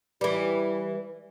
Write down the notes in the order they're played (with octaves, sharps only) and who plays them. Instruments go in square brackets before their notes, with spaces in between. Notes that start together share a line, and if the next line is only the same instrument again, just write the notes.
[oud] E3 G3 [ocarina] B4